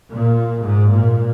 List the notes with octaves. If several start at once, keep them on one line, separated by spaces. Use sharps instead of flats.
A#2
G#2
A#2